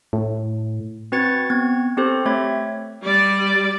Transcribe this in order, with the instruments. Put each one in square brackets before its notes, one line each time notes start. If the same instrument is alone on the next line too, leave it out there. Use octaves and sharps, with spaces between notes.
[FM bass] A2
[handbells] C4 F#4 B4 G#6 A6 C#7
B3 C4 G#6
C4 G4 A4 C5
A3 C4 C#5 E5 G#6
[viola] G3 D5